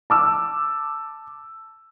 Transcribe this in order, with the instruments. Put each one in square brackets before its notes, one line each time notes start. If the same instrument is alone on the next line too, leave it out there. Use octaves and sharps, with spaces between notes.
[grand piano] A5 D6 E6